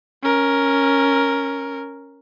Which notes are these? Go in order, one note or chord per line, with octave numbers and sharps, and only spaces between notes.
C#4 A#4